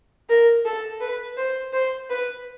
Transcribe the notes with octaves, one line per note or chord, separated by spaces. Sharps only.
A#4
A4
B4
C5
C5
B4